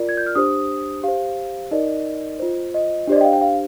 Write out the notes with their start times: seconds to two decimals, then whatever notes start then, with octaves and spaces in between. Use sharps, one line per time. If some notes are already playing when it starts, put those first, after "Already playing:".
Already playing: F4 A#4 D5
0.09 G#6
0.17 G6
0.26 F6
0.35 D4 G4 C5 D#6
1.03 G4 C5 F5
1.71 D#4 A#4 D5 D#5
2.39 F4 C5
2.74 D#5
3.07 D4 G4 C5 D5
3.16 D#5
3.21 G5
3.24 F5
3.33 G5
3.41 F5